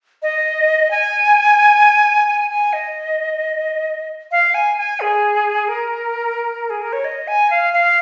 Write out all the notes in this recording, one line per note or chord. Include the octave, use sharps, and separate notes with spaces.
D#5
G#5
G#5
G#5
D#5
F5
G#5
G#5
G#4
A#4
G#4
A#4
C#5
D#5
G#5
F5
F5